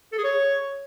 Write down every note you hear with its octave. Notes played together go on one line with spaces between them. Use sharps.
A4
G#4
C#5